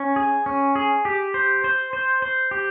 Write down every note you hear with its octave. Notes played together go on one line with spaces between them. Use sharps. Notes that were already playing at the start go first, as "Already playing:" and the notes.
Already playing: C#4
G#4
C#4
G#4
G4
C5
C5
C5
C5
G4